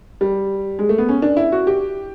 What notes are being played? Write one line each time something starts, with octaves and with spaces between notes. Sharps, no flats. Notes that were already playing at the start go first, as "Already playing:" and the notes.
G3
G#3
A3
B3
C#4
D4
E4
F#4
G4